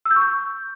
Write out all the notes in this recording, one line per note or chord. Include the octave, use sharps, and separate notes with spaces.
E6
G6
C#6
G6